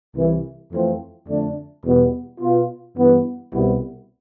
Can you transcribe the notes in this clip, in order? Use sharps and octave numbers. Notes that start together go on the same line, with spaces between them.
C2 C3 E3
F2 E3 A3 C4 F4
F2 D3 A3 D4
E2 B2 G3 B3
B2 B3 F4
G2 E3 B3
C2 B2 G3 B3 E4